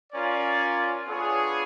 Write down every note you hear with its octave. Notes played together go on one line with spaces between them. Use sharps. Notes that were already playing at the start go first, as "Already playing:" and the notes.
C#4 F4 A#4 D5
B3 D4 F4 G#4 C#5